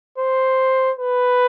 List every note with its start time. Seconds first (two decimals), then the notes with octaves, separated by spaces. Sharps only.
0.18 C5
0.99 B4